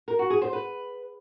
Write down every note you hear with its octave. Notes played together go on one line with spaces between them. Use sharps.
A#4
F#4
G#4
C5
B4